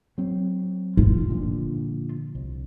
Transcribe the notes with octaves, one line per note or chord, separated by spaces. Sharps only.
F#3 C4
F4
A#2 D3 F3
C2